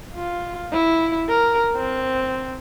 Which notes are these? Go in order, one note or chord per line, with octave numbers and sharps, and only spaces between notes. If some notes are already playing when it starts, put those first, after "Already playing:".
F4
E4
A#4
C4